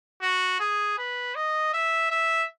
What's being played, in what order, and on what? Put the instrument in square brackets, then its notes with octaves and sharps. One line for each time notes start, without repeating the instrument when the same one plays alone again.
[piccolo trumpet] F#4
G#4
B4
D#5
E5
E5